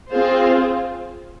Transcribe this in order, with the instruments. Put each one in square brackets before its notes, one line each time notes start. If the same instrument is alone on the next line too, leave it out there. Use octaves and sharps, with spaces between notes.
[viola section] C4 F4 G#4 C5